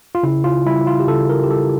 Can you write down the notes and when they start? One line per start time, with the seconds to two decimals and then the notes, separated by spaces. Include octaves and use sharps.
0.15 F4
0.23 C#3 E4
0.44 F4
0.66 G3 E4
0.87 F4
1.00 G4
1.08 C#3 A4
1.29 A#4
1.43 G4
1.50 G3 A4